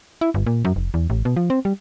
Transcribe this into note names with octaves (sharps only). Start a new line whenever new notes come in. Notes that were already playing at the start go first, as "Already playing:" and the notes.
E4
G1
A#2
F#2
F1
E2
A1
B2
F3
C4
G3